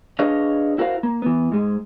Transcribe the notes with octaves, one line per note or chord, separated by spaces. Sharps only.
D4 G#4 B4 C#5 D#5 F5
E4 F#4 A#4 C5 F5
A#3
E3 B3
G#2 G#3